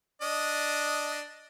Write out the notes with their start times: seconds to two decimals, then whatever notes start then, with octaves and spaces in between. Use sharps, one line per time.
0.22 D4 D#5